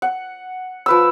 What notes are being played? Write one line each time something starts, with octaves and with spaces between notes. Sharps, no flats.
F#5
F3 B4 E6